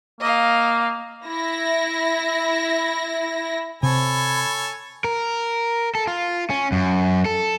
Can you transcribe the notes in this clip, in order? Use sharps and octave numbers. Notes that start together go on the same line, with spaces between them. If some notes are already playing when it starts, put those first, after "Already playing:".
A#3 D#5 F5
E4 A#6
C3 A4 C#5 G#5 B5
A#4
A4
F4
C#4
F#2
A4